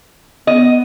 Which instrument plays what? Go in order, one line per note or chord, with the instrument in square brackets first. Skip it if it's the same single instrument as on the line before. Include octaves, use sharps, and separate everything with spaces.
[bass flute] B3 [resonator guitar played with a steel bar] D#5